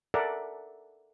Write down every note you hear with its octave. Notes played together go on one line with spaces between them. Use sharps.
A4 A#4 D5 E5 F#5